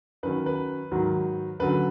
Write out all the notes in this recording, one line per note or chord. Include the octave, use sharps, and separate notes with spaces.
F#2 D#3 F#3 B4
B4
G#2 D#3 F#3
F#2 D3 F#3 B4